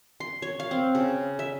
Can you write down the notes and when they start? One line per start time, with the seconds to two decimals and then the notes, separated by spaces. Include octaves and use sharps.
0.20 C6
0.42 C#5
0.60 F5
0.71 C4
0.95 C#3
1.39 E5